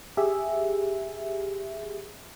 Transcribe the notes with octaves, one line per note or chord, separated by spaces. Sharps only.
G4 G#4 E5